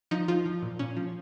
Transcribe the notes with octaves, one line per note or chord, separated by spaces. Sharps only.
F3 D#4
F3 F4
F3
A#2
A#2 C#4
F3